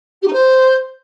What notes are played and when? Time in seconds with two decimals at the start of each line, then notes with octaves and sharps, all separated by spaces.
0.22 G4
0.27 D#4
0.32 C5